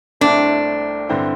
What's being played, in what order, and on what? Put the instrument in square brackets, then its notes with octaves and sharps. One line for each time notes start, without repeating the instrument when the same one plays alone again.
[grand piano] C2 C3 A3 C4 E4 [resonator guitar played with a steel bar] D4
[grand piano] G2 D3 C4 E4